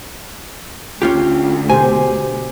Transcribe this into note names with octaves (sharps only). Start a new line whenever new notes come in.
D2 C#4 F4 G4
B2 G4 C5 G#5